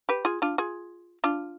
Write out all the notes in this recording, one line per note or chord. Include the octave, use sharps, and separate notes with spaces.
G4 B4
F4 G#4
D4 F4
F4 G#4
D4 F4